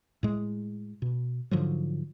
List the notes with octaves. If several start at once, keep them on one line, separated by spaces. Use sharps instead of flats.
A2 G#3
B2
G#2 D3 F3 F#3